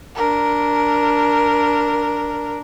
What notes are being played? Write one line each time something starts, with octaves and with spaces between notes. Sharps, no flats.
D4 A#4